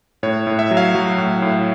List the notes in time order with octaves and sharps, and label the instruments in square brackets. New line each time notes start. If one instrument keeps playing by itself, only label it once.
[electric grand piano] A2 C#5
A2
E5
F#3
F5
F#3
A2
A2